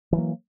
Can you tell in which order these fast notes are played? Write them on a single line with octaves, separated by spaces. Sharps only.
E3 F#3 A#3